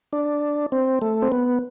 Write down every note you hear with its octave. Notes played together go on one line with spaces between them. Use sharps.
D4
C4
A3
C4
B3